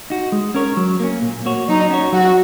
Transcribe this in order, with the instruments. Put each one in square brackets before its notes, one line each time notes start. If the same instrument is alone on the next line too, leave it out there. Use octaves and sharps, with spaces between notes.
[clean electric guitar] D#4 F#4
G#3
C#4 A#4 C#5
F#3
A#3 C#4
A#2
A#3 F#4 C#5
[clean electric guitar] F#3 [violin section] D#4
[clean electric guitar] C#4 F#4 C#5
[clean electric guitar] F#3 [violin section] F#4